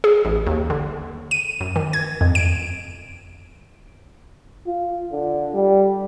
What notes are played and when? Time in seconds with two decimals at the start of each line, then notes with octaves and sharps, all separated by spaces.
0.04 G#4
0.25 A1
0.46 D#2
0.70 D3
1.31 D#7
1.60 F#2
1.76 D#3
1.93 G#6
2.21 F2
2.35 D7
4.67 F4
5.12 D3
5.54 G3